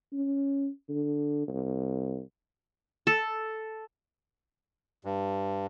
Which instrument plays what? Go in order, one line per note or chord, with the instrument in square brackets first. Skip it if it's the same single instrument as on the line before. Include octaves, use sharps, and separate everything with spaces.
[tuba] C#4
D3
C2
[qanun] A4
[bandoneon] G2